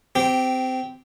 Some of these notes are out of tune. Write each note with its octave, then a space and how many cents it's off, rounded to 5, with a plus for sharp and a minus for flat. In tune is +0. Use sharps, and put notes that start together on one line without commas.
C4 -20 G4 +0